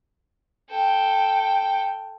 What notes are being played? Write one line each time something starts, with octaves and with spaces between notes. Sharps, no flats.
A4 G5